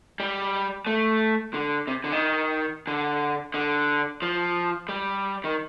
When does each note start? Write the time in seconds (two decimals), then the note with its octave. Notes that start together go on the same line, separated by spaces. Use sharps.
0.20 G3
0.87 A3
1.54 D3
1.87 C3
2.04 D3
2.12 D#3
2.87 D3
3.54 D3
4.22 F3
4.89 G3
5.44 D#3